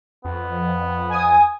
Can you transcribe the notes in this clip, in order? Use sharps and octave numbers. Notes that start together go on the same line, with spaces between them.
F2 B3
G#5 D#6